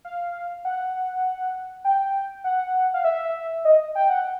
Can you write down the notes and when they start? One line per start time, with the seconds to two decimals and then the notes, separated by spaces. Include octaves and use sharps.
0.05 F5
0.65 F#5
1.85 G5
2.44 F#5
2.94 F5
3.04 E5
3.65 D#5
3.95 G5
4.10 F#5